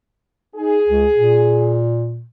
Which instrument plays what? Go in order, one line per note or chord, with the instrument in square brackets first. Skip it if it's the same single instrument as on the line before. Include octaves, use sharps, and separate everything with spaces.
[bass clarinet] D#4 [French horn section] G#4
[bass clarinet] C#2
A#2